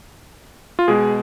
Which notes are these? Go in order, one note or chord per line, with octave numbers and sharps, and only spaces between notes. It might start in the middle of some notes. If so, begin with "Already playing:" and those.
F4
B2 G#3 G#4